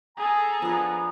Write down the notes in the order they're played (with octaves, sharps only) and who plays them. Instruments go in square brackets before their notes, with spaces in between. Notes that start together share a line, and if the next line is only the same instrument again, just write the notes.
[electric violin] G#4 A4 [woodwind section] G#5 A#5
[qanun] F3 D4 [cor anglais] B3